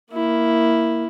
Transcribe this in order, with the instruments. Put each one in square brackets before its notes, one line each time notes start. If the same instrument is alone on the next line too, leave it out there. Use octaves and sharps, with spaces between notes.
[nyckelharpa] A#3 E4